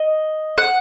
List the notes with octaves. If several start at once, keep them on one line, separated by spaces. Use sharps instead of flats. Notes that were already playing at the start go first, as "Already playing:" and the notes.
Already playing: D#5
F#5